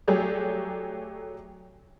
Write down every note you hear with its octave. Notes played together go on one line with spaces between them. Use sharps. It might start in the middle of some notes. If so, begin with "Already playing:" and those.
F#3 A3 G4 G#4 D5